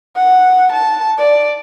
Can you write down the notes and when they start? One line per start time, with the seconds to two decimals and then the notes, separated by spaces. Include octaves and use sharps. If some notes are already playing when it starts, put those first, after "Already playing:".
0.16 F#5
0.72 A5
1.18 D5